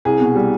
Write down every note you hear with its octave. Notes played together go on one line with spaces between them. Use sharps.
C2 G#4
B2
G3